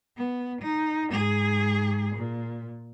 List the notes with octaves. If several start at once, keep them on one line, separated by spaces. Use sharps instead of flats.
B3
D#4
G#2 G#4
A#2